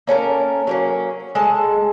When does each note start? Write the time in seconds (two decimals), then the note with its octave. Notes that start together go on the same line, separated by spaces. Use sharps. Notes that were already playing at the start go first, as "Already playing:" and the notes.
0.07 A#3 C#4 A4 A#4
0.67 F#3 A#3 C#4
1.35 G#3 A4 A5